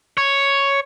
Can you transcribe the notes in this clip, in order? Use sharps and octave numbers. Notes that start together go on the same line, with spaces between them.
C#5